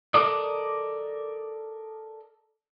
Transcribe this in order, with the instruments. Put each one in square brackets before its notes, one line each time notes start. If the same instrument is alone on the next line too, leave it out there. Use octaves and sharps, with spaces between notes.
[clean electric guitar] A4 A#4 D5 D#5